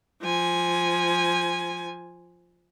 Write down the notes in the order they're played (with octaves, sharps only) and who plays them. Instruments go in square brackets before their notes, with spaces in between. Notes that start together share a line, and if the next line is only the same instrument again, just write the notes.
[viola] F3 G#5